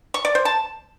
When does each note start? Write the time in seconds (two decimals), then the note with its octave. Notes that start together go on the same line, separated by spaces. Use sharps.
0.14 C#6
0.25 D5
0.35 C5
0.45 A5